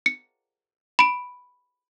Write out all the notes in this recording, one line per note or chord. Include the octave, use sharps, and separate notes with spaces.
C#7
B5 D7